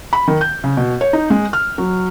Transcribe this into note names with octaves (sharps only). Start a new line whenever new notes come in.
B5
D#3
G6
C#3
B2
C#5
D#4
G#3
F6
F#3